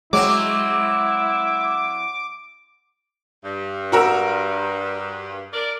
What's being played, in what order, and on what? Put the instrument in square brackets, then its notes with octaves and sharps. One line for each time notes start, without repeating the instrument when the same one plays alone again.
[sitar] F#3 C4 [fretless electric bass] G#3 [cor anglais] E4 [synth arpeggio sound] D6
[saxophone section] G2
[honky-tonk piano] F#4 A#4 E6
[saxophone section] A#4 D5